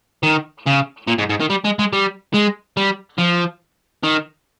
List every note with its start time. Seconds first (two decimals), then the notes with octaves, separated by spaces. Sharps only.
0.23 D#3
0.66 C#3
1.07 A#2
1.18 G#2
1.29 G#2
1.40 D#3
1.50 G3
1.64 G#3
1.79 G#3
1.93 G3
2.34 G#3
2.77 G3
3.19 F3
4.03 D#3